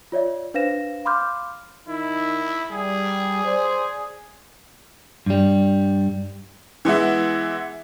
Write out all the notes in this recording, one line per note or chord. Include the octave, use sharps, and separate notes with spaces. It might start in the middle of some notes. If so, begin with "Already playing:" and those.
F4 C#5 D5 E5
D4 B4 C5 F5 A#6 E7
F5 B5 C6 D6 F6 G6
D#3 D#4 E4
G3 G#4
C5 D5
G2 G3
E3 G#3 B3 E4